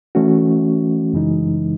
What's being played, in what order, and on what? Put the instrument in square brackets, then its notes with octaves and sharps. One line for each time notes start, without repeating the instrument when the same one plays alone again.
[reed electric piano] E3 A3 C#4 F#4
F#2 C#3 E3 G#3 D#4